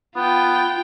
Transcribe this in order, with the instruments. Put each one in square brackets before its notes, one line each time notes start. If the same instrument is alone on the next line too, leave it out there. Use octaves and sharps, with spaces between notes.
[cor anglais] B3 [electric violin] F4 G5